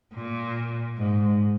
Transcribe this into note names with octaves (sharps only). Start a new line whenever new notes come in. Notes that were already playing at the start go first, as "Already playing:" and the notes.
A#2
G#2